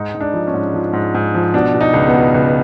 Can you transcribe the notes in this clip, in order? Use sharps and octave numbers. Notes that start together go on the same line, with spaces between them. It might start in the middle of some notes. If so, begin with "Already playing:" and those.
Already playing: G#2 D#4
G#2
D4
F3
C#4
G#2
F3
G#2
G#2
F3
B2 D4
B2
D#4
C#2
B3
B2
C#2